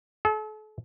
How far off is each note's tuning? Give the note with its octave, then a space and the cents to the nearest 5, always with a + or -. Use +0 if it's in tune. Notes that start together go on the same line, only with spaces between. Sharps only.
A4 -40